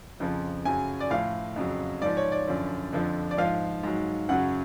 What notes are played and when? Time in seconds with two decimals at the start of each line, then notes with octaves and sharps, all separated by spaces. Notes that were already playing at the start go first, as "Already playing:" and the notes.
0.20 F2 C#3 F3
0.65 F#2 C#3 F#3 G#5
1.00 D5
1.11 A2 F3 F5
1.56 F2 C#3 F#3
2.02 G#2 F3 D5
2.17 C#5
2.32 D5
2.47 F#2 D3 F3
2.93 F2 D3 F3
3.31 D5
3.38 G#2 F3 F5
3.83 G#2 F#3
4.29 F#2 C#3 F#3 F#5